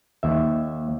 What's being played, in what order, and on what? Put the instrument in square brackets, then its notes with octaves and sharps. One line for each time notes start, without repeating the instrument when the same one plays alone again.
[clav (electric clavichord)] D#2 E5